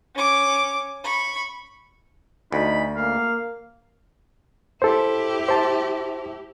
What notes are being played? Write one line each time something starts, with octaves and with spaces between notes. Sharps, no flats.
C#4 D6
B5 C#6
D2 D#4 B5
A#3 F5
E4 G4 A4 C5
C5 A5